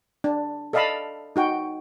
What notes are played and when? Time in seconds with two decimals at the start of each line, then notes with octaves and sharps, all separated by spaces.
0.24 D4
0.73 A4 D5 D#5 F5 A5 B5
1.36 D#4 F#4 G5